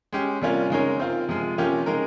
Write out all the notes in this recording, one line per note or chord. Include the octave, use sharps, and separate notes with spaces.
G#3 C#4 G4
C3 G3 A#3 C#4 F4
C#3 G#3 D#4 A#4 C#5
C4 F4 A#4
C3 F3 G#3
C3 F3 A#3 C#4 G4
C#3 G#3 D#4 A#4